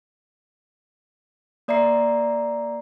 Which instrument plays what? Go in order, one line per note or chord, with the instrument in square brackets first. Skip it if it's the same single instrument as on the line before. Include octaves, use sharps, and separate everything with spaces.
[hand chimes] A#3 D5 E5 A#5 C7